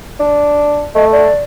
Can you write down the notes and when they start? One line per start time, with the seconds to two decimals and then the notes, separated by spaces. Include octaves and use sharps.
0.20 D4
0.95 A3 D#5
1.12 D5